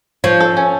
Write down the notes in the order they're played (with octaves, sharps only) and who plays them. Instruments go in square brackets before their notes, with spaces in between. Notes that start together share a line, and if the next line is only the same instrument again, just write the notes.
[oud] F3 [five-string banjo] C#5
[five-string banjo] A4
C#4